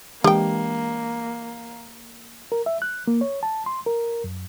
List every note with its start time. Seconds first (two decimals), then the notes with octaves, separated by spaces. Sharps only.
0.24 E3 G#3 A#3 D4 G4 G5
2.52 A#4
2.66 E5
2.82 F#6
3.08 A#3
3.21 C#5
3.43 A5
3.66 C6
3.86 A#4
4.24 F#2